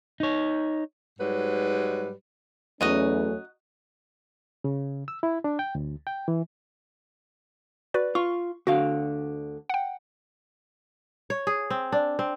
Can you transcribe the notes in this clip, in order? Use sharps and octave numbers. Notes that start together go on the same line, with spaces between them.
D#4 C#5
G#2 F#3 G3 B4
E2 F#3 A3 C#4 D#4 F#4 D#5
C#3
E6
E4
D4
G5
D2
G5
E3
F#4 B4 D5
F4 C#6
D2 D3 F#4 F5
F#5 G5
C#5
G#4
C4
D4
C4